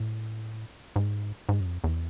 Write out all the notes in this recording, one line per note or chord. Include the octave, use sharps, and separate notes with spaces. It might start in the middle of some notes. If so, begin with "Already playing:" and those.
Already playing: A2
G#2
G#2
F#2
F2
E2